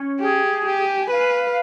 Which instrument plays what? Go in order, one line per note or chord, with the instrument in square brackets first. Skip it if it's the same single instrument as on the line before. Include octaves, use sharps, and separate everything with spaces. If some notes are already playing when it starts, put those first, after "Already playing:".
Already playing: [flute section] C#4
[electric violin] G4 [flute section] G#4
[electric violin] G4 [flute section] G#5
[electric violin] B4 [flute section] F5